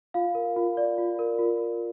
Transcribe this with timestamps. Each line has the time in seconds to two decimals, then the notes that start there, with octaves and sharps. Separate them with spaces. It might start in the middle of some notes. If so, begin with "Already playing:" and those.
0.14 F4 F5
0.35 A#4
0.56 F4
0.77 D5
0.98 F4
1.19 A#4
1.39 F4